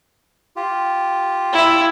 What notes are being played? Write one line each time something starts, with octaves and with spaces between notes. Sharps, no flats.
F4 G4
E4